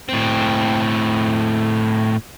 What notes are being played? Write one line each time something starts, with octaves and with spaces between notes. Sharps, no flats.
A2 C4